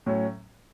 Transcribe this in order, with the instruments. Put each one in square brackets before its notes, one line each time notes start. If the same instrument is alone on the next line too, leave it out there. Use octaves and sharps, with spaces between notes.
[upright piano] A2 F#3 C#4